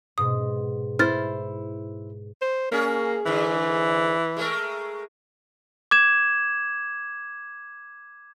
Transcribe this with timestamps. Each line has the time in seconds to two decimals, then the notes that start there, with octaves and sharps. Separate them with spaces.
0.18 G#2 B2 D#6
0.99 E4 C5 F6 A6
2.42 C5
2.72 A#3 C#4 G#4
3.26 G#2 D3 E3
4.37 G#3 A3 A#4
5.91 D6 G#6 E7